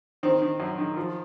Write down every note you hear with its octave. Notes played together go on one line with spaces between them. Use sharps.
D#3 C4
D#3
F#2
D#3
F3